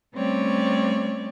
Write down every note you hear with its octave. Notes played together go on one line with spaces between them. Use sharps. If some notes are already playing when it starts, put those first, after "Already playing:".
G3 A3 C4 C#4 C#5 D5